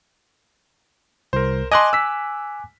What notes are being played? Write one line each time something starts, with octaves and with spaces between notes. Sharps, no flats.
C2 A#4 C5
D#5 G#5 A5 C6 D6 F#6
E6 B6